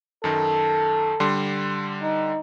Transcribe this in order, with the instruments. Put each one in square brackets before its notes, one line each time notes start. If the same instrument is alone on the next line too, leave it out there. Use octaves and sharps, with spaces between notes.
[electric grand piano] F#2 D#3 [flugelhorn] A4
[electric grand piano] D3 G3 C6
[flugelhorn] D#4